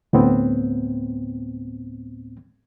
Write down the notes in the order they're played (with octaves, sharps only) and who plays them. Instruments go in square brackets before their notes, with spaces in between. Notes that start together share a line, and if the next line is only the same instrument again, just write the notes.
[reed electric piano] D2 A2 B3 C4